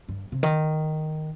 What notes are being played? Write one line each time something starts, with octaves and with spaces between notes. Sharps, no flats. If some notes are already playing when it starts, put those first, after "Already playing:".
G2
C3
D#3